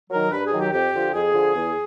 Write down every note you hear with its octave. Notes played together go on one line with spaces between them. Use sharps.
D#3 F#3 A#4
G2 B4
G#4
D#3 F#3
G4
F2 G4
D3 F3
F2 G#4
D3 F3
E2